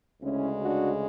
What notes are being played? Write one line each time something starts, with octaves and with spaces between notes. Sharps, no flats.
D2 C#3 G#3 C#4 E4
D4 F#4